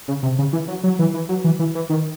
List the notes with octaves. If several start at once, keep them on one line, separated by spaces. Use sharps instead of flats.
C#3
C3
C#3
E3
F#3
F#3
E3
E3
F#3
E3
E3
E3
D#3